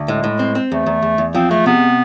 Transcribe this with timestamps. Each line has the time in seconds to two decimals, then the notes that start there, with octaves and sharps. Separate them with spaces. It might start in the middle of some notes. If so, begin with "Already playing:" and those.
Already playing: D2
0.08 A2 G#3
0.24 A2
0.39 C4
0.55 C4
0.71 E2 A3
0.86 E2
1.03 E2
1.18 E2
1.35 F3 C4
1.50 G#3 A3
1.66 C3 B3